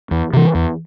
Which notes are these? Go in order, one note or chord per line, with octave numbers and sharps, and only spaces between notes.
E2
C3 E3
E2